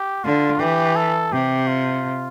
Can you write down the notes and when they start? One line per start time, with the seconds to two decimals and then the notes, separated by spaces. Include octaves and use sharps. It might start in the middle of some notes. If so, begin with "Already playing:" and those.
Already playing: G4
0.24 D3 F4
0.60 E3 G4
0.96 A4
1.32 C3 G4
1.68 F4